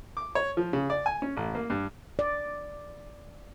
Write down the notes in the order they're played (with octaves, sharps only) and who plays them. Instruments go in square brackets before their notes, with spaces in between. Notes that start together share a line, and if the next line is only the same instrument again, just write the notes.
[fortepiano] D6
C#5
F3
C#3
D5
G#5
C#4
A1
A#3
G2
[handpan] D5